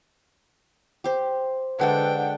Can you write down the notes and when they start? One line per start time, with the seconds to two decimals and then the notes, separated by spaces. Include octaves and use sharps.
1.04 G4 C5
1.79 D3 G#3 D4 A4 B4 F#5 G5